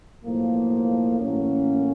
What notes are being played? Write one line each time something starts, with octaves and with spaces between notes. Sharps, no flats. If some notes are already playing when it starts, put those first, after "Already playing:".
B1 A2 F3 A#3
A1 A2 F#3 A#3 C#4